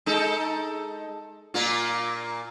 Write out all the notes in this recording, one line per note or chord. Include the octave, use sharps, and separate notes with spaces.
G#3 D#4 A4
A#2 A#3 F4